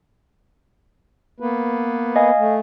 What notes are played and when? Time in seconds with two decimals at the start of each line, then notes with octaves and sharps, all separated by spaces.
1.40 A#3 B3 B4
2.16 D#5 F5 G#5
2.38 A3